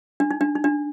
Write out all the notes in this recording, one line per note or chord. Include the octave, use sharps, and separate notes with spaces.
D4
D#4
D4
D#4
D4